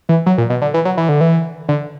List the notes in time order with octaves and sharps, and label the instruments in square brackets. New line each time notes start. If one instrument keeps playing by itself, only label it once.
[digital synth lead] E3
F#3
A#2
B2
D3
E3
F#3
E3
D3
E3
D3